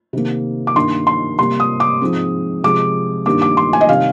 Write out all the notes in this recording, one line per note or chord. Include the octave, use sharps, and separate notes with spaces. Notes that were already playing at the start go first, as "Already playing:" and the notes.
C3 D#3 A#3
D6
G2 D#3 A#3 C6
C6
C3 G3 A#3 C6
D#6
D6
G#2 F3 G#3 C4
C3 F3 G#3 C4 D6
G2 D#3 G3 A#3 D6
D6
C6
G#5
D#5
C3 D#3 G3 C4 F5